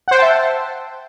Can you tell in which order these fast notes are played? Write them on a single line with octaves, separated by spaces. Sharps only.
F#5 C5 G5 A5 E5